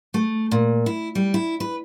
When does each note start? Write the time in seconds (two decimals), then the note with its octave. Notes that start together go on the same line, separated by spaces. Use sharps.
0.14 A3
0.51 A#2
0.86 E4
1.15 G3
1.34 E4
1.60 B4